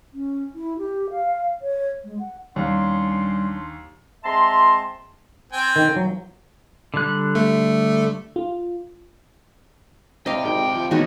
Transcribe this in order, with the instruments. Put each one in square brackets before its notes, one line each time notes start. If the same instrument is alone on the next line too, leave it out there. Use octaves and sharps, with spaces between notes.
[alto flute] C#4
E4
G4
F5
C#5
G#3
F#5
[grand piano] D#2 [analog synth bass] G3 [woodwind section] C#4 D4 C6
[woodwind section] G#3 C4 E5 A5 A#5 C6
[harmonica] C4 G5 G#5
[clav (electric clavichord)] D#3
F#3
[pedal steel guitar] D3 G3 F#6
[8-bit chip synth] A3
[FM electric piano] F4
[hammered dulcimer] C3 E4 D5 [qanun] D#5 F5 [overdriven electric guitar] G5
[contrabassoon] G#1 [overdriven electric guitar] D2 G5
[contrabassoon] F3
[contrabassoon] E2 [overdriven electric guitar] D#3 [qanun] D#4 F#4 C#5